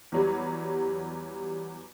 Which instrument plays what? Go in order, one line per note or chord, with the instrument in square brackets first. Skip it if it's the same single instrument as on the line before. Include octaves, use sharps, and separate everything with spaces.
[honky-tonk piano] E2 F#3 G3